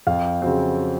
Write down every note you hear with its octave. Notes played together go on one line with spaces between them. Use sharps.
F2 F5
C#3 F#3 C4